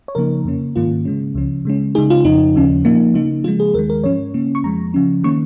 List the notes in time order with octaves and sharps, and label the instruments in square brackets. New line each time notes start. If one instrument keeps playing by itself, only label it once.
[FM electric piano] C#5
C#3 F3 A#3 D#4 A#4
F2 C#3 A#3 C#4
G#2 D#3 A#3 C#4 F4
C#3 G#3 C#4
C#2 C#3 F3 C#4
C#3 G#3 C#4
C#3 G#3 D#4 G#4
F4
F2 C#3 F3 D#4
D#2 C#3 F3 C#4
A#2 F3 A#3 D#4
C#3 A#3 D#4
C#3 F3 G#3 F4
G#4
D#2 D#3 G#3 A#4
A#4
G#2 F3 C#4 C#5
C#3 A#3 C#4
C#6
F2 F3 G#3 A#5
C#3 F3 C#4
D#3 A#3 C#4 C#6